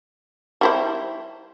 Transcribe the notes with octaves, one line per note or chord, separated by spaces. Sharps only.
G3 E4 C5